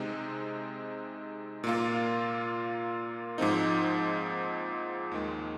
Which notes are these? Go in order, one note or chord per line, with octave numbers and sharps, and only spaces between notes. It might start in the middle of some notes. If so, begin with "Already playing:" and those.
Already playing: C3 G#3 C4 D#4
A#2 A#3 F4
G#2 F3 C4 D#4
D#2 D#3 G#3